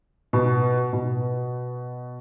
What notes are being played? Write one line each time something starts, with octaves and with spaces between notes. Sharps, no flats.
B2
B2